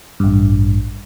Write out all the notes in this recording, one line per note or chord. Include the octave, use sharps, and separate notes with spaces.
A1 G2